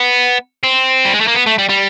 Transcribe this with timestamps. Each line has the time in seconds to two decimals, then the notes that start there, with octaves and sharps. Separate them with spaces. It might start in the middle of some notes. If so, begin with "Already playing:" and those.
Already playing: B3
0.64 C4
1.05 G3
1.13 G#3
1.20 A3
1.27 A#3
1.34 B3
1.46 A3
1.58 G3
1.69 G3